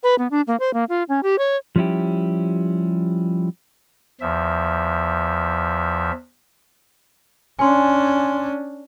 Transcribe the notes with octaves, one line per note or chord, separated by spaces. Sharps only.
B4
B3
D4
A#3
C5
A#3
F4
C#4
G4
C#5
F3 G3 C#4 E4 G4
E2 F3 E5
C#4 D4 G#5 C6